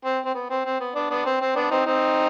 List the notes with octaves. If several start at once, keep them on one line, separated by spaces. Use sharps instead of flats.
C4
C4
B3
C4
C4
B3
B3 D4
B3 D4
C4
C4
B3 D4
C4 D#4
C4 D#4